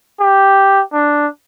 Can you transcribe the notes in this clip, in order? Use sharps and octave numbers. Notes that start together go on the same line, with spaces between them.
G4
D4